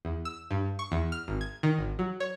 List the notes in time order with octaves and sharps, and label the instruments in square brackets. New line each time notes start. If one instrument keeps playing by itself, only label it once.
[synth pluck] E2
E6
G2
C#6
E2
F6
G#1
G#6
D#3
G#1
F#3
C#5